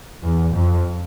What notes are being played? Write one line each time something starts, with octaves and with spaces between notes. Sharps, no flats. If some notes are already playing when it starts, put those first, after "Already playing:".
E2
F2